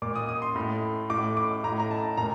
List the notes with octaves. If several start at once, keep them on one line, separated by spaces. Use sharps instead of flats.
A#2 D6
D#6
D#6
C6
A2
A2 D6
D6
A2 A#5
A#5
A5
A#2 A#5